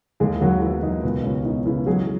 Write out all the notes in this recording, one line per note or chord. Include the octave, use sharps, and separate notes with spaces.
D#2 G#3 G#4
E4
D#2 F#3 F#4
E3 F#3 E4
D#3 D#4
C#2 B2 B3
C#2 C#3 C#4
D#3 E3 D#4
C#3 E3 E4
F#3 G#3 G#4